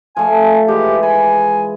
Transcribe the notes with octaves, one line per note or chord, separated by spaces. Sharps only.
F3 A3 G#5
E3 G#3 G4
G#5 B5